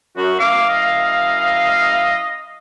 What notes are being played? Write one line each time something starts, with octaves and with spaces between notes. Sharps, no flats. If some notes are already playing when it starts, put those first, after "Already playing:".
F#2 F#4
F#2 E4 F5 D6
D#5